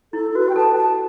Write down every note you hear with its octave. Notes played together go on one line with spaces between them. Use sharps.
E4 A4
A4
F#4 B4
G4 G5
A4 A5
A5